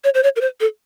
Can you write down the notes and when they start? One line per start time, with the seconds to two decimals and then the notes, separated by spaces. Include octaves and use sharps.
0.04 C#5
0.14 C5
0.23 C#5
0.36 A#4
0.41 C5
0.60 A4